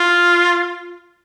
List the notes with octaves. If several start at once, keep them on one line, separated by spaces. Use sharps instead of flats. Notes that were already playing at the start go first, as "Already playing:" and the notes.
Already playing: F4